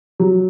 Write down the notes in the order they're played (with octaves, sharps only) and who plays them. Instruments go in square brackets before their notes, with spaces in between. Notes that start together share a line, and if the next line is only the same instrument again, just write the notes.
[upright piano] F#3